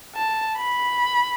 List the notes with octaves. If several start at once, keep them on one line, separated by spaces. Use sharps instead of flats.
A5
B5